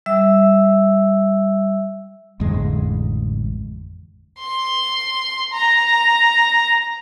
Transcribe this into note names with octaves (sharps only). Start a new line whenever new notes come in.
G3 E5 E6
A1 F2 D3 G#3
C6
A#5